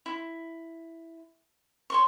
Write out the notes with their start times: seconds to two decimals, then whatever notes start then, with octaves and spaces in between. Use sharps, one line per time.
0.06 E4
1.90 C#5 C6 C#6